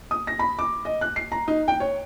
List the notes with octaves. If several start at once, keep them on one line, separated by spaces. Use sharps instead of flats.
D#6
A#6
B5
D6
D#5
F#6
C7
A#5
D#4
G5
C#5